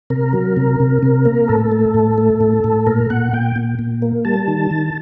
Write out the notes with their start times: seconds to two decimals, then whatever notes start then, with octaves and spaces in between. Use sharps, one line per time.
0.10 C3 A#4
0.33 F#3
0.57 C3
0.80 C3
1.03 C3
1.25 A#3
1.48 A2 A4
1.72 A3
1.94 A2
2.18 A3
2.41 A2
2.64 A2
2.87 A#2 A#4
3.10 A#2 F#5
3.33 A#2 G5
3.56 A#2
3.79 A#2
4.02 A#3
4.25 G3 A5
4.48 D#3
4.71 D#3